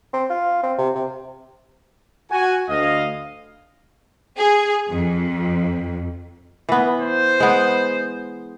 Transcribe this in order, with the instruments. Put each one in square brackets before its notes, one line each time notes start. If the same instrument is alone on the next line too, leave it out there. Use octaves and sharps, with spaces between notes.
[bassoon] C4
F4
C4
C3
C3
[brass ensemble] F#4 G#5
D2 D#5 F5
[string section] G#4
F2
[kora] E3 B3
[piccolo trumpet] C5
[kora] G#3 B3